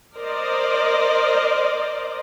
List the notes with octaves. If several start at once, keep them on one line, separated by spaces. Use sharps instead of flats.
A#4 C5 D5 D#5